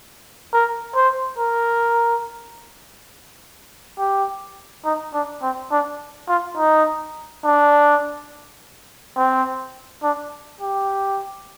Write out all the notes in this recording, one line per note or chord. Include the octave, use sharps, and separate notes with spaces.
A#4
C5
A#4
G4
D#4
D4
C4
D4
F4
D#4
D4
C4
D4
G4